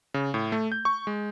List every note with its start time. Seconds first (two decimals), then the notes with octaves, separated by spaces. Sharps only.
0.14 C#3
0.34 A2
0.52 A3
0.72 G6
0.85 C#6
1.07 G#3